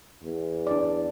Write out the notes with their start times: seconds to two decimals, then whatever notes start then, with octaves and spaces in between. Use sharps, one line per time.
0.23 E2
0.67 D4 D5